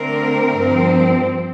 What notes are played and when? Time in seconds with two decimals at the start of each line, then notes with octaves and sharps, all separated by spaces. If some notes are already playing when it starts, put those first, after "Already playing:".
Already playing: D3 A3 C4 A#4
0.55 G2 F3 C4